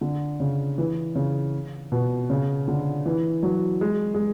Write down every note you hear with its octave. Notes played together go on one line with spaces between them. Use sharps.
D3
C#3
E3
C#3
B2
C#3
D3
E3
F#3
G#3
G#3